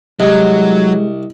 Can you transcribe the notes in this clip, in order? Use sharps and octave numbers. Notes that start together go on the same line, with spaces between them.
C2 F#3 G#3 D#5